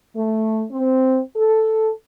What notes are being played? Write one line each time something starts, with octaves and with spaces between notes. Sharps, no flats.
A3
C4
A4